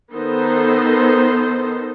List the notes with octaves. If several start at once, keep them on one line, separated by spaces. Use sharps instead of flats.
D#3 B3 D#4 A4 C5